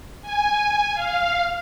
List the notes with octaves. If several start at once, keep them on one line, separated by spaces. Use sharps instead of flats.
G#5
F5